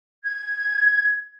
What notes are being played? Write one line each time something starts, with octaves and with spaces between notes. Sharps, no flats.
G#6